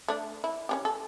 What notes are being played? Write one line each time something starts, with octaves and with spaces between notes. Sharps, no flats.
A3 D4
E4
C#4 D4 G4
A4